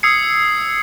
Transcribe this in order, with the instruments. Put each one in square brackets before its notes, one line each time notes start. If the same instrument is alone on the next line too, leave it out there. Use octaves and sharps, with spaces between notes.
[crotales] D#6 E6 G#6 C7 C#7